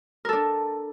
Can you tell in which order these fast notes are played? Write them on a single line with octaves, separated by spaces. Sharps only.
A#4 A4 D4